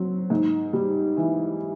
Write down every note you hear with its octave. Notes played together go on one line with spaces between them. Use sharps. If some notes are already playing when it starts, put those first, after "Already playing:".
Already playing: F#3 C4
G#2
G3
E3